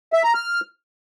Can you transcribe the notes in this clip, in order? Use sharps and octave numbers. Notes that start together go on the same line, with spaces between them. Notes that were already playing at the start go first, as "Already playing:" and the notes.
E5
A#5
F6